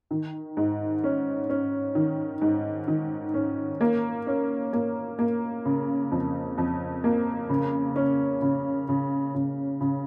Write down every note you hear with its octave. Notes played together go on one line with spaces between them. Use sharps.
D#3
G#2
C#4
C#4
D#3
G#2
D#3
C#4
A#3
C#4
A#3
A#3
C#3
F2
F2
A#3
C#3
C#4
C#3
C#3
C#3
C#3